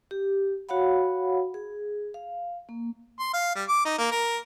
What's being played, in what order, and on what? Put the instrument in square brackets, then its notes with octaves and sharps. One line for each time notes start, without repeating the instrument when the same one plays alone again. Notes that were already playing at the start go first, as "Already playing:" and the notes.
[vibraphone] G4
F#4 C#5 F5 F#5 B5
G#4
F5
A#3
[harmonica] C6
F5
G3
D6
D#4
A#3
A#4